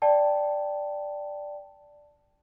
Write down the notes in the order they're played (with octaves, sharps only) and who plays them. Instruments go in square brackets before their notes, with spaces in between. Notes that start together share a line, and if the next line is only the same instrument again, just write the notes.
[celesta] D5 G5 A5